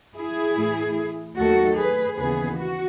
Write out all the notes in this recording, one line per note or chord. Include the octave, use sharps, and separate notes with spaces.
E4 G#4
A2 E3 A3
D#2 D#3 F#3 A3 F#4 A4
G#4 B4
D#2 C#3 E3 B3 G#4 B4
F#4